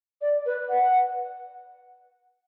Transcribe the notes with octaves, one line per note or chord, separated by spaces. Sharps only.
D5
B4
F#5